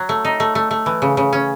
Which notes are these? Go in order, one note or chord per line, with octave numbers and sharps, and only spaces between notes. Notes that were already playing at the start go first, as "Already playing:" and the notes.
Already playing: F#3
A3
D#4
A3
A3
A3
E3
C#3
C#3
C#4